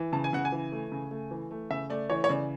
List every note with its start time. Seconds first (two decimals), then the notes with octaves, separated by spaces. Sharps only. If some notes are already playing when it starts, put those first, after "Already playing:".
Already playing: E3
0.13 C#3 A5
0.24 G#5
0.33 C#3 F#5
0.45 G#5
0.52 E3
0.72 A3
0.92 C#3
1.11 A3
1.31 E3
1.51 A3
1.70 C#3 E5
1.90 A3 D5
2.10 E3 C#5
2.24 C#5
2.29 C#3 D5